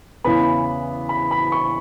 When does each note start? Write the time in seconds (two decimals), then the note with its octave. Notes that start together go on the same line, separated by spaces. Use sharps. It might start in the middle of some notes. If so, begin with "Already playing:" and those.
0.24 E2 C#3 E3 B3 B5
1.09 B5
1.31 B5
1.52 C#6